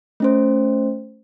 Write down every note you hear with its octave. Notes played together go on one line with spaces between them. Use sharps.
A3 C#4 C5